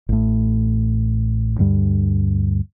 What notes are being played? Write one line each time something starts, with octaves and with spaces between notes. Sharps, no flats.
A1 A2
D2 G2 G3